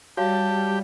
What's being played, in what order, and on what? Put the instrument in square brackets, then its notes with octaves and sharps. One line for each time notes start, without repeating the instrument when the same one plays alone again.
[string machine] G3 [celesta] F#4 C#5 F5 [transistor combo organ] G4 [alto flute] A5